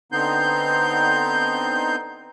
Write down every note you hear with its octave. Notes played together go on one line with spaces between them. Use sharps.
D3 B3 C4 D#4 C6 G6